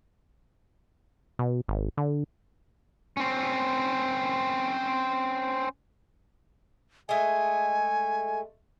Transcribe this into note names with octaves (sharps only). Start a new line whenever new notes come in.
B2
G#1
D3
C4 C#4
G#3 A3 G#5